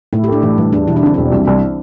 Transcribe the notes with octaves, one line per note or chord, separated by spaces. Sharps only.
A2 E4
G4
A3 D4
A2 E3
E3 G3
E2 D4
E1 E4
D4
D3 C4
E1 D4
C2
C2